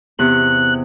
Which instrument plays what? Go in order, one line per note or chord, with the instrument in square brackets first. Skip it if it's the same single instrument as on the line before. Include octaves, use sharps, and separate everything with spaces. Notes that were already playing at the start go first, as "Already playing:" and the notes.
[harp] E2 C3 [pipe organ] F#6